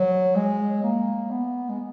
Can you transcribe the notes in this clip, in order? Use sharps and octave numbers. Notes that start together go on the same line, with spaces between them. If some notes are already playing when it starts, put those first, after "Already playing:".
Already playing: F#3
G#3
A#3
B3
G#3